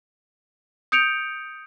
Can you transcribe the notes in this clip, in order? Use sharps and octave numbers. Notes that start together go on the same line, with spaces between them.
D#6 G6 C#7 D7 F7